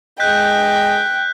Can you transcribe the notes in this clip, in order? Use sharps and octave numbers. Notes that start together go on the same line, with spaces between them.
G#3 G#4 D#5 G5 F#6 G6 B6